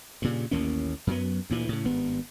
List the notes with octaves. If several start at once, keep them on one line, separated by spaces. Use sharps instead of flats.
G2 A#2 C#3
A1 D#2 A#3 C#4
F#2 F#3 B3
D2 A#2 E3
A2 C#3
G#1 G2 B3